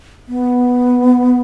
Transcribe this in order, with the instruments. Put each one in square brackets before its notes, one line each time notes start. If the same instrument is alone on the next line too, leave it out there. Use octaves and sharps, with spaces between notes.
[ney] B3